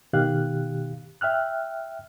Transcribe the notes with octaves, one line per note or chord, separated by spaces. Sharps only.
B2 D#3 G4 F5 F#6
E5 G5 F6 F#6